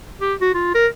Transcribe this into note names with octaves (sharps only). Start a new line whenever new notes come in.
G4
F#4
F4
A#4